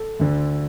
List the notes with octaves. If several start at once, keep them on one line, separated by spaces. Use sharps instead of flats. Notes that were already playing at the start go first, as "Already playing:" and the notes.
Already playing: A4
D2 D3